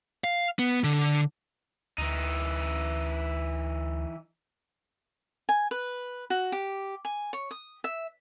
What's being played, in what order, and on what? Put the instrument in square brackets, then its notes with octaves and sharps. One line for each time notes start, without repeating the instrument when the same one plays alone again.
[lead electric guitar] F5
B3
D3
[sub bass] D2 [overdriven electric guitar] E3 D#4
[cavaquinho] G#5
B4
F#4
G4
G#5
C#5
D#6
E5